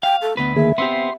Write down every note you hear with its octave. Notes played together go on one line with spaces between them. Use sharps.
F5 G5
A4
D2 B3 B4
D#3 A#3 G#4 E5
B3 C4 G4 C6